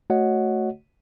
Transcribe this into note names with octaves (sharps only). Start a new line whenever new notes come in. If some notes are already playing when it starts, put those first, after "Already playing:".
A3 F#4 C#5 D#5 F#5